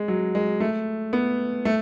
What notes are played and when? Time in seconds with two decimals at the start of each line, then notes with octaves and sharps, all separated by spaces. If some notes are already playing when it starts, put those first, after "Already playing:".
Already playing: G#3
0.08 F#3
0.35 G#3
0.60 A3
1.13 B3
1.65 A3